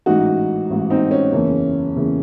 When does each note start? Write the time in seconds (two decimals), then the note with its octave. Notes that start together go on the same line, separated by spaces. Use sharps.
0.06 A1 G#2 E3 D#4 F#4
0.70 A1 G#2 E3
0.90 C4 D#4
1.11 C#4
1.32 F#1 E2 C#3 E3
1.95 F#1 E2 C#3 E3